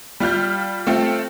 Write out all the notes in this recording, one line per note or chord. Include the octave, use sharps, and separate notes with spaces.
G3 F4 F6 G6
A3 C4 F4 A4